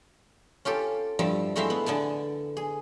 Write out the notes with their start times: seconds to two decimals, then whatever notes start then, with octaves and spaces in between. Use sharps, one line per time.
0.65 C#4 F4 G4 A4
1.19 G2 F3 G3 E4 A5
1.56 G#3 A3 C4 E4 E5 F5
1.70 B3
1.86 D3 B3 G#5 A5
2.57 G#4